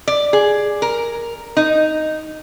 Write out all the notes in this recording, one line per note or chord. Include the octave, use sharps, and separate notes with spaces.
D5
G#4
A#4
D#4